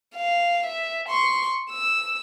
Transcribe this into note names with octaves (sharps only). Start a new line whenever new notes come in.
F5
E5
C6 C#6
E6